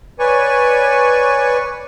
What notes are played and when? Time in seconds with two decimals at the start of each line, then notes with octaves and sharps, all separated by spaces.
0.19 B4 C#5 D5 G#5 C#6